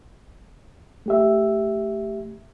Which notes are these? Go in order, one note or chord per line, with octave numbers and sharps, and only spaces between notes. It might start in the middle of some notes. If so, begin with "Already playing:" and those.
A3 G4 E5